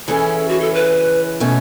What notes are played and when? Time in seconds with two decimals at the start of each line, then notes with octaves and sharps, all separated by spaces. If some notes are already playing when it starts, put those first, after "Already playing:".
0.08 C#3 E3 C#4 E4 A4
0.49 F#4
0.61 A4
0.74 B4
1.40 B2 A3 C#4